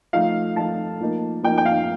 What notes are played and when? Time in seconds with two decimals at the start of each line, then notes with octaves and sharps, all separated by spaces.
0.13 F3 A3 D#4 F5
0.56 F3 A3 D#4 A5
1.00 F3 A#3 D#4
1.43 F3 A#3 D#4 G5
1.58 G5
1.66 F5